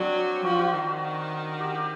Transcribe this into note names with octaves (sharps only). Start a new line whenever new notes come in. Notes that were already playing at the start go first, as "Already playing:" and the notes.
Already playing: F#3 C4 D4
F3 F#4
F4
F#4
D#3
G4
G4